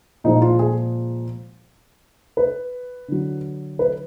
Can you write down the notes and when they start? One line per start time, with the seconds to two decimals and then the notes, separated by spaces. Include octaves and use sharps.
0.24 A#2 F3 G#3 D#4
0.42 F4
0.59 G#4
2.37 B4
3.08 D3 F#3
3.79 B4